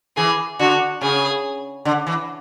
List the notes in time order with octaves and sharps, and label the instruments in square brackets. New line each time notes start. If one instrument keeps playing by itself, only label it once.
[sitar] E3 [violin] G#4
[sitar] D3 [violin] F#4
[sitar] C#3 [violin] G#4
[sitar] D3
E3